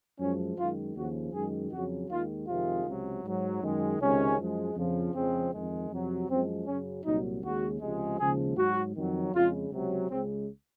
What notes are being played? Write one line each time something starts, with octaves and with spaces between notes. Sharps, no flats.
F#2 F3 G#3 C#4
F#2 D#3 G#3 F4
D#2 C#3 F3 F#4
F#2 D#3 G#3 G#4
F2 C#3 F#3 F#4
D#2 D#3 G#3 F4
F2 C3 D#3 G#3 F4
C#2 C3 F#3
G#2 F#3
F#2 D#3 G#3
C#2 C3 D#3 G#3 C#4
F#2 F3 G#3
F2 C#3 F3
F2 C#3 F3 G#3 C4
F2 D#3 G#3
F2 C3 F#3
F#2 F3 G#3 C4
F#2 C#3 F#3 C#4
C2 A#2 F#3 D#4
D#2 C#3 G#3 F#4
C#2 C3 F3 G#3
D#2 C#3 F3 G#3 G#4
G#2 F#3 F#4
F2 D#3 F#3
F2 C#3 G#3 F4
C#2 C3 F#3
C#2 C#3 G#3 C4